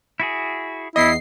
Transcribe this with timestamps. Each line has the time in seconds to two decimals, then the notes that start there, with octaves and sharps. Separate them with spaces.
0.20 E4 F#4 G#4
0.96 E2 E4 D#5 C7